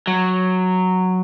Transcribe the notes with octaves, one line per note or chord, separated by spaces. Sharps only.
F#3